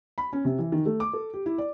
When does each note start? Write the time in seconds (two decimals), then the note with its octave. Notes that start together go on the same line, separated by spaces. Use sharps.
0.18 B5
0.33 C#4
0.45 C3
0.59 E3
0.72 D#3
0.86 A3
1.00 D6
1.13 A4
1.34 G4
1.46 E4
1.58 D5